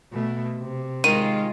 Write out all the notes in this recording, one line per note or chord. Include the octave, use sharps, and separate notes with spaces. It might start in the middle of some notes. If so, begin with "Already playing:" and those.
B2 A3
C3
D#3 G#3 F4 D#7